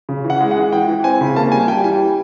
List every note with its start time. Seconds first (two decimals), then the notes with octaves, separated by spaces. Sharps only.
0.09 C#3
0.24 E3
0.30 F#5
0.41 G#3
0.51 F#5
0.57 E3
0.72 E3 G5
0.88 E3
1.04 C4 G#5
1.21 C#3
1.36 A#3 A5
1.52 G3 G#5
1.68 G3 G5
1.84 E3 G#5